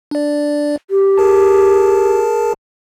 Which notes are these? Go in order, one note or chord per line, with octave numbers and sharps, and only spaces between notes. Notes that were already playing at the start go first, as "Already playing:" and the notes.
D4 D5
G4
G#4 A#4 A5